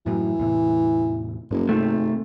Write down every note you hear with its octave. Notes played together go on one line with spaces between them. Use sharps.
F#2 A2 E3 F#3
E2 A2 C3
F#1 G2 A#3
G#1 C3 A3